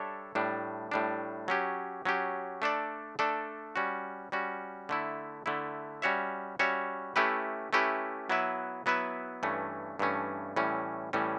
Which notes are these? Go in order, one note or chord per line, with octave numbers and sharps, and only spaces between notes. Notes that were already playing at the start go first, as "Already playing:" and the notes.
Already playing: G3 D4 A4 C#5 E5
A2 G3 D4
A2 G3 D4
F#3 C#4 G4
F#3 C#4 G4
A3 D4 A4 D5
A3 D4 A4 D5
G3 C#4 F#4
G3 C#4 F#4
D3 A3 E4
D3 A3 E4
G3 C#4 F#4 C#5 E5
G3 C#4 F#4 C#5 E5
A3 C#4 E4 G4 B4
A3 C#4 E4 G4 B4
F#3 B3 E4 B4 E5
F#3 B3 E4 B4 E5
G2 E3 A3 C#4
G2 E3 A3 C#4
A2 E3 G3 C#4
A2 E3 G3 C#4